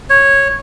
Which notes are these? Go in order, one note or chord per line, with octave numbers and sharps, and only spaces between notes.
C#5